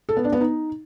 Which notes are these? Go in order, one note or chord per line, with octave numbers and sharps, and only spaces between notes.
A4
B3
D4
B3
D#4